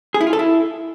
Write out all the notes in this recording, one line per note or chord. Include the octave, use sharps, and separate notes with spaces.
G#4
E4
F4
A4
E4